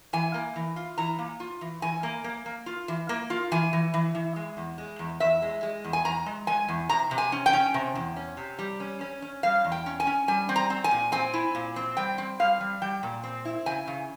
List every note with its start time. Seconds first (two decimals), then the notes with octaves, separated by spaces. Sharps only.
0.13 E3 G#5
0.34 A#3
0.56 E3
0.76 F4
0.98 E3 A#5
1.19 A#3
1.40 F4
1.61 E3
1.82 E3 G#5
2.03 A#3
2.24 A#3
2.46 A#3
2.66 F4
2.88 E3
3.09 A#3
3.30 F4
3.52 E3 G#5
3.73 E3
3.94 E3
4.15 E3
4.36 G#3
4.57 E2
4.78 G#3
4.99 E2
5.20 E2 E5
5.42 G#3
5.63 G#3
5.84 E2
5.93 G#5
6.05 E2 A#5
6.26 G#3
6.47 G#3 G#5
6.69 E2
6.89 C3 A#5
7.11 C3
7.18 G#5
7.32 C#4
7.46 G5
7.53 C#4
7.74 C3
7.95 E2
8.16 C#4
8.37 C3
8.59 G3
8.80 C#4
9.01 C#4
9.22 C#4
9.43 G3 F5
9.64 E2
9.72 G5
9.86 C#4
10.00 G#5
10.07 C#4
10.28 G3 G#5
10.49 C4
10.56 A#5
10.70 C4
10.84 G#5
10.91 A#2
11.12 C4 G#5
11.34 E4
11.55 A#2
11.76 C4
11.97 G3 G5
12.18 C4
12.39 G3 F5
12.61 G3
12.82 G3 G5
13.03 A#2
13.24 C4
13.45 E4
13.66 C#3 G#5
13.88 C#3